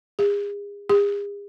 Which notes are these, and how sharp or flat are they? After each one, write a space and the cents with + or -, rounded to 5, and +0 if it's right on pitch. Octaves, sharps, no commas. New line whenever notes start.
G#4 -35
G#4 -45